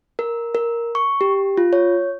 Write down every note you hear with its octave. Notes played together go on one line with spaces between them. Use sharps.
A#4
A#4
C#6
G4
F4
C#5